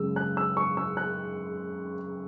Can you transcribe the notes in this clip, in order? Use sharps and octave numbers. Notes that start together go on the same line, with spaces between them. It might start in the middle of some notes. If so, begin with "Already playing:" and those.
Already playing: F#2 C#3 G#3 E6
F#6
E6
C#6
E6
F#6